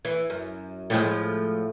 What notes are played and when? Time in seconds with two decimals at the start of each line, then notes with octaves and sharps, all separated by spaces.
0.05 E3
0.30 F#2
0.90 A2 F3 G#3